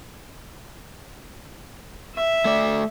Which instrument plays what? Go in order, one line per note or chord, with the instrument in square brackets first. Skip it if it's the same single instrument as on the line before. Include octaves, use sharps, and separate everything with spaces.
[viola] E5
[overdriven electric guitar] A3 D5